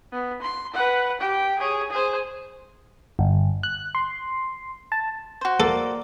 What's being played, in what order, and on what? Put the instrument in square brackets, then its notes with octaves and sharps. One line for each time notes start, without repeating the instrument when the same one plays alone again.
[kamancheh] B3
C6
B4 F#5
G4 G5
G#4 C#5
G#4 C5
[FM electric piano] G1
F#6
C6
A5
[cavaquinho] F#4 C5
[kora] A#3 D5 [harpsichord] A4